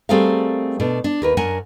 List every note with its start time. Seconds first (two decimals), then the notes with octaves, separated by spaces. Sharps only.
0.09 G3 A3 C4 G#4 A#4 F5
0.80 B2 A3 D4
1.04 D4
1.22 D#2 A#4 B4
1.37 F#2 D4 A#4 F#5 G#5